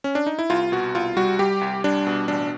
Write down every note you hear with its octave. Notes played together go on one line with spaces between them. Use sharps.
C#4
D4
D#4
E4
C2 F4
B2 F#4
C2 F4
G3 F#4
G3 G4
C2
G3 D4
B2
A1 D4